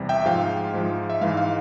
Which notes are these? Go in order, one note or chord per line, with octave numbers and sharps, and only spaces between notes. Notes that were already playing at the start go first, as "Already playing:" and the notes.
Already playing: E2 C3 G3
E5 G5
G#2 F3 G#3 F5
G#2 F3 G#3
E5
G#2 E3 G#3 F5
F5